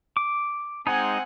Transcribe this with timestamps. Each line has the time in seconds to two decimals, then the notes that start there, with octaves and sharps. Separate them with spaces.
0.17 D6
0.87 G#3 C4 D#4 F#5 G#5